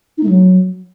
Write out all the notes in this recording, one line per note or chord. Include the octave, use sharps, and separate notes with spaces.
D#4
A3
F#3